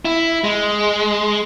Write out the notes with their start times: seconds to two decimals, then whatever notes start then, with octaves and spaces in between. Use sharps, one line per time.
0.05 E4
0.44 G#3